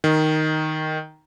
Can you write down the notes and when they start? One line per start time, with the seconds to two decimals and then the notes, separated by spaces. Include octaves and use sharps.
0.04 D#3